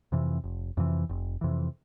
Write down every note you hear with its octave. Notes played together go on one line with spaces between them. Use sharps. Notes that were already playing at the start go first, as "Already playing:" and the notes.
F2 C3 E3
F1
F2 C3 E3
F1
F2 C3 E3